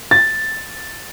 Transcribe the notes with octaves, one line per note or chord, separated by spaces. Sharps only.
A6